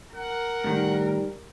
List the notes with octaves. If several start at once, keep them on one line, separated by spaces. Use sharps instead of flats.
A#4 F#5
A2 D#3 G3